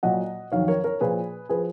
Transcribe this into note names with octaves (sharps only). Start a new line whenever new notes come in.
A#2 F#3 D#5 F#5
F2 D#3 F#3 C#5 F5
A#4 C#5
A#4 C#5
A#2 F3 G#4 B4
F3 G#4 B4